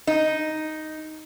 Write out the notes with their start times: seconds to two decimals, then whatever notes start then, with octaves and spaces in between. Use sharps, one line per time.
0.07 D#4